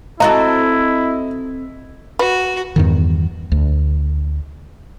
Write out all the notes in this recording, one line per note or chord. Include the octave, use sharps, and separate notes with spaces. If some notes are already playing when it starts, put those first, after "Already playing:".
C4 E4 F#4 A4 D#5 A#5
F#4 B4
E2 G2 D#3
D2